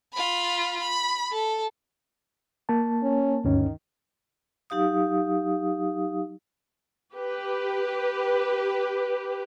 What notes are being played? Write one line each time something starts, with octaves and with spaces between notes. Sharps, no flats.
F4 B5
B5
A4
A#3 A5
C#4
D2 G2 D#3 C#4
F#3 D#4 G4 F5 D#6
G4 B4